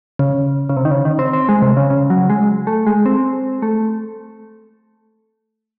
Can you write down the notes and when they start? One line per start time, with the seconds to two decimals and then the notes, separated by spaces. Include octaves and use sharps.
0.19 C#3
0.69 C#3
0.77 C3
0.85 D#3
0.91 C#3
1.05 D#3
1.19 C4
1.33 C4
1.49 G#3
1.62 C3
1.77 C#3
1.90 C#3
2.10 F#3
2.30 G#3
2.67 A3
2.86 G#3
3.06 C4
3.62 A3